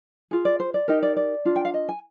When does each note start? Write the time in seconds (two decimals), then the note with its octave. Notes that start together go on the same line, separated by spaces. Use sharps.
0.31 F4 G#4
0.45 D5
0.60 C5
0.74 D5
0.88 D#4 G4 A#4 D#5
1.03 D5
1.17 D5
1.45 D4 F4
1.56 G5
1.65 F5
1.74 D#5
1.89 G#5